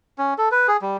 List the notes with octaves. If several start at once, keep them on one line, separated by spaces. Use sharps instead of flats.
C#4
A4
B4
G#4
G3